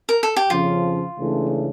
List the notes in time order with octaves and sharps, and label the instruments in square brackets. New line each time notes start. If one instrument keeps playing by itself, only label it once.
[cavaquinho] A#4
A4
G4
[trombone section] F2 C#3 F3 C#4 [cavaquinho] F4
[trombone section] C#2 C#3 E3 A3 D4